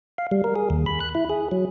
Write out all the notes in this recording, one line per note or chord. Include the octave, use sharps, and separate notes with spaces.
F5
G3
A#4
G#4
D#2
B5
F#6
E4
G#4
F#3